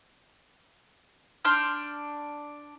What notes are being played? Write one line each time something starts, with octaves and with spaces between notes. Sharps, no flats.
D4 C6 F6 G6